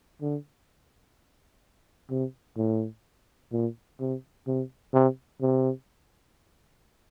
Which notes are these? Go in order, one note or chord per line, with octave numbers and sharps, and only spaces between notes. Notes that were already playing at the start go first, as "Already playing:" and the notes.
D3
C3
A2
A#2
C3
C3
C3
C3